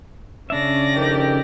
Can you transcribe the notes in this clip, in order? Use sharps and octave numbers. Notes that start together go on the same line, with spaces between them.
C#3 C#4 D4 D5 E5 A#6
F2 D#3 G4